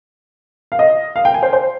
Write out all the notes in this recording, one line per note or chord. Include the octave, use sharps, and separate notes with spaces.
F5
D#5
F5
G5
G#5
C5
C5